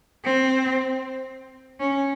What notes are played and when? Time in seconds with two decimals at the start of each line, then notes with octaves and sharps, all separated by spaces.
0.24 C4
1.79 C#4